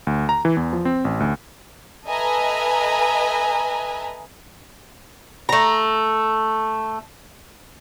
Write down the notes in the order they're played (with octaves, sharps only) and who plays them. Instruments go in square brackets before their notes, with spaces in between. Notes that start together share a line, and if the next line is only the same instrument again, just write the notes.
[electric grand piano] D2
A#5
E3
E2
F3
C4
A1
D2
[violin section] A4 B4 D#5 E5 G#5 A#5
[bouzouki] A3 A#5